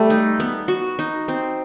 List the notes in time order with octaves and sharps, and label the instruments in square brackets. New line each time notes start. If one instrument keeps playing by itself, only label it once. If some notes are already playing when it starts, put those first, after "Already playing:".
Already playing: [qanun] G3 [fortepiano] A3
[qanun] D#4
B3
F#4
D#4
C4